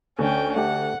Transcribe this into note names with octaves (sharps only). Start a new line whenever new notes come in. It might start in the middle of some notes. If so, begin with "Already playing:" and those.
D2 C#4 G5
A3 G4 F#5